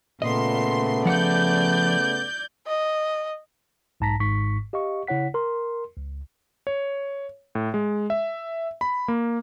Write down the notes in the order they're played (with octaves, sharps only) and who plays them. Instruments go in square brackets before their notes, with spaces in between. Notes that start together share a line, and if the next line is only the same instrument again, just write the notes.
[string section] A#2 C6 [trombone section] C#3 A3 B3 [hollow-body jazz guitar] D#5
[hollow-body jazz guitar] F3 F#5 [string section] D5 G6
[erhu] D#5
[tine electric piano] B1 G#2 A5 A#5 A#6 B6
G#1 G#2 C#6 B6
G4 D#5 F5 C#6
C#3 E4 C#5 F#5 B6
A#4 C6
C#2
[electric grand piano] C#5
A2
G#3
E5
B5
A#3